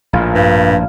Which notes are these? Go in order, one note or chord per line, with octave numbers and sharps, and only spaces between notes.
A#1 A2 F4 A#4 B5
G2